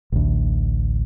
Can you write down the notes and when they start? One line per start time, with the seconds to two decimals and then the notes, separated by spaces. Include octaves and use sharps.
0.12 A1 D2